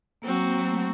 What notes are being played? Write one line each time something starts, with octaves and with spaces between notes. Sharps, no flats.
F#3 A#3 C4 F#4
A#3
A#3
A3